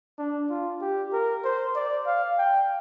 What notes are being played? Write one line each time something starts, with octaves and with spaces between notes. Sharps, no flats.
D4
F4
G4
A#4
C5
D5
F5
G5